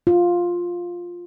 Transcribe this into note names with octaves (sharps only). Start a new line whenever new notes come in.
F4